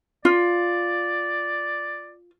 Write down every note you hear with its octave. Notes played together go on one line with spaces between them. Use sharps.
F4 D5